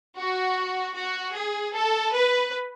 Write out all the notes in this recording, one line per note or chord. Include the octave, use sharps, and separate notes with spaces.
F#4
F#4
G#4
A4
B4